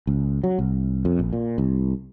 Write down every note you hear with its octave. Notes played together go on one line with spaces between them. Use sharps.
C#2
F#3
C2
F2
A#1
A#2
C2